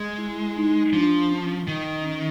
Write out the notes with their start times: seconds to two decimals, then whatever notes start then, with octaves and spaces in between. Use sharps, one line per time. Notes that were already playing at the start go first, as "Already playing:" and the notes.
Already playing: G#3
0.18 E4
0.57 D#4
0.93 F3 D4
1.31 C#4
1.68 D#3
2.05 C#4